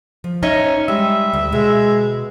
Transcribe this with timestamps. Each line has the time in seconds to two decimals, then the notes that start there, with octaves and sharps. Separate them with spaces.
0.24 F3
0.43 C#4 D#4 D#5 E5
0.88 G3 G#3 E5
1.33 D2
1.52 B2 G#3